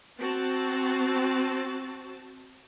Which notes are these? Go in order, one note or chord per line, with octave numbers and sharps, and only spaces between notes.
C4 F#4 A5 A6